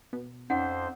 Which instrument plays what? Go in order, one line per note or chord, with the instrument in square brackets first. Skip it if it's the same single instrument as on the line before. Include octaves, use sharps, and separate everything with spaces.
[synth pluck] B2 B3
[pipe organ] F2 C5 [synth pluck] C#4 D#4 D5 [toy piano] F#5